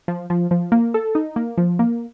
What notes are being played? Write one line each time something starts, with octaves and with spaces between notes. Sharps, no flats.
F3
F3
F3
A#3
A4
D#4
A#3
F3
A#3